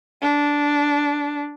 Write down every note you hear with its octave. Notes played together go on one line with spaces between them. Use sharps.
D4